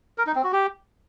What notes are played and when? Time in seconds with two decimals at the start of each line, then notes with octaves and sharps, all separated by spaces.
0.18 A#4
0.27 D#4
0.35 C4
0.44 F#4
0.52 G4